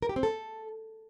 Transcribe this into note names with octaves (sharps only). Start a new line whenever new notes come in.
A#4
G4
C4
A4